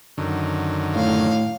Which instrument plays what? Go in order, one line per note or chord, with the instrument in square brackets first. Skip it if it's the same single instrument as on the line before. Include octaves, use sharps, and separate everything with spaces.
[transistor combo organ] F#2 D3 D#3
[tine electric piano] A2 [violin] F5